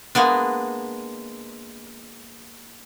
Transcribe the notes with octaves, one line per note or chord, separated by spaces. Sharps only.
G#3 A#3 B3 D4